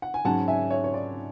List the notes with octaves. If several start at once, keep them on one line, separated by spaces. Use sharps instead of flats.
F#5
G#5
G#2 F#3 C#4 F#5 A5
E5 G#5
C#5 E5
C#5
D5